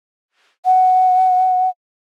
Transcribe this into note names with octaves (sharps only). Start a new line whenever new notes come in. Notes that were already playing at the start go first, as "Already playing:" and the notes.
F#5